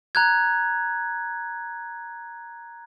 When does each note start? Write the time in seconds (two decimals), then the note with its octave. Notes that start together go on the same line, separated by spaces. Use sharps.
0.15 A#5 F#6 G#6